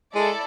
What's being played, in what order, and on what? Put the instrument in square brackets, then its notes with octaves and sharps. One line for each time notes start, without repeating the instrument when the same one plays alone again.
[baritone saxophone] G#3 [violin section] E4 A4 D5